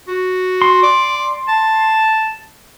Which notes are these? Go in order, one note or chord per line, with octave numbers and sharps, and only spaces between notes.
F#4
C6
D5
A5